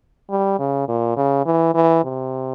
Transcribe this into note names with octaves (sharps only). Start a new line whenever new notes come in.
G3
C#3
A#2
C#3
E3
E3
C3